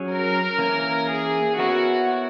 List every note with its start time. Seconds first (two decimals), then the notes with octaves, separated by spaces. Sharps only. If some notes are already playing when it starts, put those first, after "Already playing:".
Already playing: F#3 C#4 G#4 C#5
0.09 A#4
0.58 E3 A#3 C#4
1.10 G#4
1.59 B3 E4 F#4 A#4 C#5